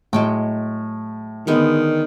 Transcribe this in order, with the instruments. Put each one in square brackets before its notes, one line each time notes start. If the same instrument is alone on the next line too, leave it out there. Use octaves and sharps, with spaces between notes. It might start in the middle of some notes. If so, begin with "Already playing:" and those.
[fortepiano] A2 [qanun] F#3 G#3 G5
[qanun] D3 G#3 B3 [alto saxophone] D#3